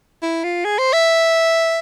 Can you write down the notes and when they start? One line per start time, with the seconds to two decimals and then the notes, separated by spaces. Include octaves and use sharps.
0.22 E4
0.44 F4
0.65 G#4
0.79 C5
0.93 E5